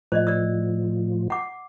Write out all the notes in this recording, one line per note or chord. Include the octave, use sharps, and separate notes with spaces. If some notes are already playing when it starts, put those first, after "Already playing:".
A2 F3 C5 D5 D#5
D5 E6
F#5 D6